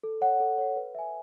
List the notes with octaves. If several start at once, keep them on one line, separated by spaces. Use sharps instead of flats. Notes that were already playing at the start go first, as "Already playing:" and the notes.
A4
C#5 F#5
A4
C#5 F#5
B4
E5 G#5